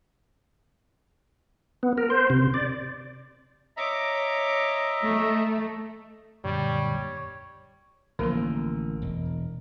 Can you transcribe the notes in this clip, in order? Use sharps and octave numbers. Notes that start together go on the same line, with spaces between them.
B3
A#4
C5
C3
D5
C#5 D#5 E5 A#5 D6
A3
F#2 A#2 D3 G3 C#5
A1 D3 F3 A#3 A#4 C6
E1